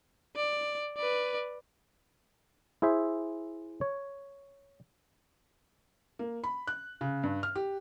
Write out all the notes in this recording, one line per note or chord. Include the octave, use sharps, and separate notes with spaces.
D5
B4 D5
E4 G#4 C5 E5
C#5
A#3
B5
F#6
C#3
G2
F6
G4